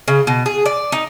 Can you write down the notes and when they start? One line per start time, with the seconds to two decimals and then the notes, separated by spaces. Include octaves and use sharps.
0.08 C#3
0.27 B2
0.46 G#4
0.66 D5
0.92 D#4